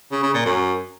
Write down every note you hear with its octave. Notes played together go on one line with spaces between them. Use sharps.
C#3
C#3
A#2
F#2